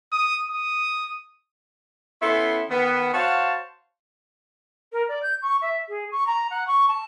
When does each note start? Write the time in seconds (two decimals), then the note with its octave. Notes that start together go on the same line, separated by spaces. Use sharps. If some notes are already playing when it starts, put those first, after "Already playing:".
0.12 D#6
0.50 D#6
2.22 B3 C#4 E4 A4 C6
2.70 D#3 B3
3.14 F#4 C5 C#5 F5 A5
4.92 A#4
5.08 D5
5.22 G6
5.42 C#6
5.61 E5
5.89 G#4
6.11 C#6
6.27 A#5
6.50 F#5
6.67 C#6
6.88 A5